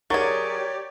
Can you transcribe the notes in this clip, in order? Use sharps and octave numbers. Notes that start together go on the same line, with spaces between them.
F#3 G4 G#4 A#4 C#5 D5 C#6 A6